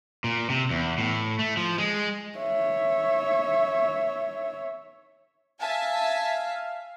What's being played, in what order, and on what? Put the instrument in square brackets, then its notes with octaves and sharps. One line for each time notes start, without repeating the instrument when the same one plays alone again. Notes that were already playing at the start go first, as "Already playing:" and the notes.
[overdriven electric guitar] A#2
C3
E2
A2
A3
F3
G#3
[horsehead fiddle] C#5 E5
[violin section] E5 G#5 A5 [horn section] F5